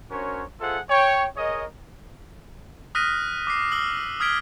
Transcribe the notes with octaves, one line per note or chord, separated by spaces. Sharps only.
C#4 D4 F#4 A#4 C5 C#5
F4 G#4 A4 C5 E5 F#5
C#5 G5
G#4 A#4 C#5 D#5
D#6 F6 F#6 A#6 B6 D#7
D6 B6 C7
E6 F6 F#7
D#6 F6 G#6 B6 D7 G7